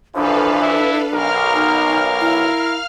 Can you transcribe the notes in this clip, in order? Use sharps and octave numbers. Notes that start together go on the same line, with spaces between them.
F#2 E3 F3 D4 A4 B4 F5
E4
B1 A#4 F5 F6
D#4
E4